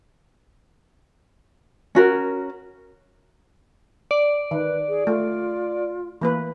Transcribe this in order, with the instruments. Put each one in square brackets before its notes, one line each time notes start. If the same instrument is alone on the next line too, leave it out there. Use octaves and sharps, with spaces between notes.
[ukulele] C#4 F#4 A#4
[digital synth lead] D5
[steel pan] D#3 [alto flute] B4
[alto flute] G#4
[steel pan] A3 [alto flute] F4
[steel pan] E3 A#3 B4